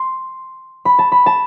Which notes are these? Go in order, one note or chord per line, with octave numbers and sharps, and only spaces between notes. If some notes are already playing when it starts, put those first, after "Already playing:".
Already playing: C6
B5
A5
B5
A5